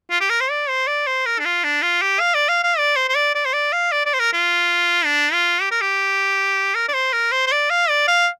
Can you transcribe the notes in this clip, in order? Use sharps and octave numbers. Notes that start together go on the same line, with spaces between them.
F4
G4
A#4
C5
D5
C5
D5
C5
A#4
D4
F4
D4
F4
G4
F5
D5
F5
F5
D5
C5
C5
D5
D5
C5
D5
F5
D5
D5
C5
A#4
F4
D4
F4
G4
A#4
G4
A#4
D5
C5
A#4
C5
C5
D5
F5
D5
F5